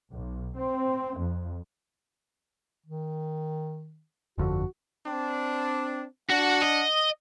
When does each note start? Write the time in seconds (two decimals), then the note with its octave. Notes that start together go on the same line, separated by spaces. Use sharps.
0.13 B1
0.57 C4
1.18 F2
2.86 D#3
4.38 G1 F2 D3 F#4
5.07 C4 D4
6.29 D4 F#4 F#5
6.62 D#5